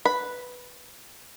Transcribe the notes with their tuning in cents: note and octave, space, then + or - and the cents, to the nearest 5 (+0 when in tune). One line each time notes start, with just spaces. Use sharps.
B4 +0 B5 +0